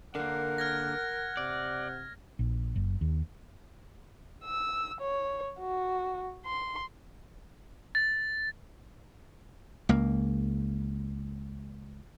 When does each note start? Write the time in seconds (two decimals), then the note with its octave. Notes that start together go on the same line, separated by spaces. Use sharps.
0.15 D3 A#3 A#4 F#5
0.58 F6 G#6 A#6
1.37 C3 D5
2.39 A#1
2.76 F#1
3.01 D#2
4.44 E6
5.01 C#5
5.60 F#4
6.46 C6
7.95 A6
9.89 C#2 A#3